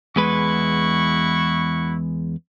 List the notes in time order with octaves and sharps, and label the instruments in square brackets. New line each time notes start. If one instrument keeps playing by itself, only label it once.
[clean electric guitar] E2 G#3 B4 [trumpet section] E4 F#4 C#6